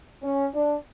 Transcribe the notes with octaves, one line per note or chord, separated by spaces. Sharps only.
C#4
D4